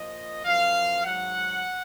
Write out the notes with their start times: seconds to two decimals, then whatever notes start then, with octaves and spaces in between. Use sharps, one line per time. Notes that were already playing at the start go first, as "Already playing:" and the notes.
Already playing: A#2 F3 D#5
0.45 F#2 F3 F5
1.04 G#2 F#3 F#5